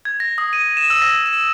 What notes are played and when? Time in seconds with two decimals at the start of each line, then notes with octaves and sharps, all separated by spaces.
0.05 G#6
0.20 A#6
0.38 D#6
0.53 D#7
0.77 E7
0.90 E6
1.02 A#6
1.26 E7